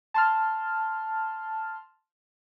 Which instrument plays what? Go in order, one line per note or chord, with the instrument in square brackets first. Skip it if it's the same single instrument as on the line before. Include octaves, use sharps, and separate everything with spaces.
[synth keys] A5 C6 F6